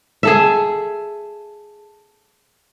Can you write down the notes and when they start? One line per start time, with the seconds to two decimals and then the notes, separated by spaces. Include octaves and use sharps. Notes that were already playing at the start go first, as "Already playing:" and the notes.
0.23 G#4 A4 E5